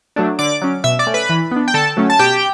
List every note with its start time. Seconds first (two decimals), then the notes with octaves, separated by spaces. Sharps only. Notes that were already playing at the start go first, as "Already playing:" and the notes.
0.16 F#3 A3 D4
0.39 D3 D5 D6
0.62 F#3 C#4
0.84 B2 E5 E6
0.99 D5 D6
1.07 A3 C#4
1.14 B4 B5
1.29 E3
1.51 B3 D4
1.68 G5
1.74 D3 A4 A5
1.97 F#3 A3 C#4
2.10 A5
2.19 B2 G4 G5